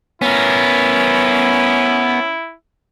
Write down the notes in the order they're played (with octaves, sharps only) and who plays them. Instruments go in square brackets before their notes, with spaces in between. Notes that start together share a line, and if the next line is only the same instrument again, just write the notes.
[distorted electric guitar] B3 A#4 [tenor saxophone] C#4 [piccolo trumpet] E4